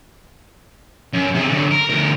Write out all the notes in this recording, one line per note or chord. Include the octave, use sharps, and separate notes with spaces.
F#2
C3 G#4
D3 F#3
A#4
D2 A#4